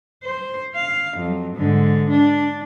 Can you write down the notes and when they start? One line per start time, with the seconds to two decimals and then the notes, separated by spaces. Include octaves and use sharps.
0.24 C5
0.76 F5
1.18 F2 F#3
1.55 G#2 D3
2.10 D4